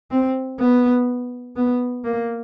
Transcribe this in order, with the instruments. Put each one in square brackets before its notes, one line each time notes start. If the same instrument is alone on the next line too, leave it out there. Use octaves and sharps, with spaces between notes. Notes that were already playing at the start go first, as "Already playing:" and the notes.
[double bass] C4
B3
B3
A#3